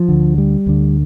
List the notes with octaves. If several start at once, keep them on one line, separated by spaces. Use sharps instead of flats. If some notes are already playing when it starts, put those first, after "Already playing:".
Already playing: F3
D2 D3
G3
D2 D3